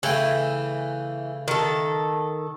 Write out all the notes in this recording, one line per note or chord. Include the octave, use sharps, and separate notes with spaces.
C#3 E3 A3 G5
D#3 A4